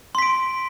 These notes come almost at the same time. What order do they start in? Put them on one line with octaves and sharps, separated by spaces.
C6 B6 D7